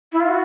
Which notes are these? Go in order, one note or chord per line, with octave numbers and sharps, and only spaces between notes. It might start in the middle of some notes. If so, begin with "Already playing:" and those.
E4
F4
F#4